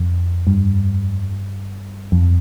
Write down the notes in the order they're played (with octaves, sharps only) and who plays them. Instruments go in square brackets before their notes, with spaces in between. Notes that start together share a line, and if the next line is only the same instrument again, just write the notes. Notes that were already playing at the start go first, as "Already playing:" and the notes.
Already playing: [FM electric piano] F2
G2
F2